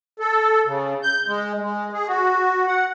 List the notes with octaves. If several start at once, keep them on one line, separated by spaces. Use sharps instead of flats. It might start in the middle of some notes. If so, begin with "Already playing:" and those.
A4
C#3
G6
G#3
G#3
G#4
F#4
F#5